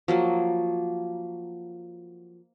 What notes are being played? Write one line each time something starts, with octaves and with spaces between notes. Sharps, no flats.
F3 F#3 A#3